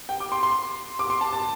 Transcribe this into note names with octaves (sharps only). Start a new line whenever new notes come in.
G5
D6
C6
C6
D6
C6
A5
A5